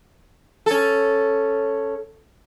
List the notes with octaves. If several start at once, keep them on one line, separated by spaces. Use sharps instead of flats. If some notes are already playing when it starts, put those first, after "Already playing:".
C#4 A4